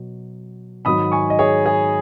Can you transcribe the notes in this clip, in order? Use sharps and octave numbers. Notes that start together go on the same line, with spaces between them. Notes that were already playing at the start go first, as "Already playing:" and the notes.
Already playing: B2 F#3
G#2 D#3 F#3 B5 D#6
G#5 C#6
D#5
G#4 C#5
G#4